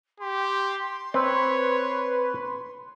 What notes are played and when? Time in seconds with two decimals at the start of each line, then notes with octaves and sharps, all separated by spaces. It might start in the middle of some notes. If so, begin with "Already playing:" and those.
0.20 G4 C6
1.14 C4 B4 C#5